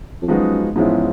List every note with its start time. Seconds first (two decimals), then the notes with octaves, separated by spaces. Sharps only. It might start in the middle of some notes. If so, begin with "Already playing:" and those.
0.22 F2
0.28 F#2 F3 G#3 B3 D#4 F#4
0.76 E2 G#2 F3 G#3 C#4 E4